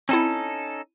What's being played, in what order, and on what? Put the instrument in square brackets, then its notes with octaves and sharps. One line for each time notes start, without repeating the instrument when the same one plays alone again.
[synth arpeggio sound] C4 E4 [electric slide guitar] C#4 D#4 A4